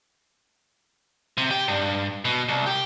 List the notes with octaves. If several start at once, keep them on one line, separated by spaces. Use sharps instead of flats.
C3
G4
G2
B2
C2
G4